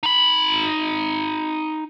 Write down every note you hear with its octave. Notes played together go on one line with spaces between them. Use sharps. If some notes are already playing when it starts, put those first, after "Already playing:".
D#4 B5